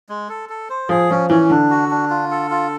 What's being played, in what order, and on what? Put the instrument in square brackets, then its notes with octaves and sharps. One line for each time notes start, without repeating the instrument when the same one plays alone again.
[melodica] G#3
A4
A4
C5
[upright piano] F3 [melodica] G#4
[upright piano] F3 [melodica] C#4
[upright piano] E3 [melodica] C#4
[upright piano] D3 [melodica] D4
[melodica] F#4
D4
F4
A4
F4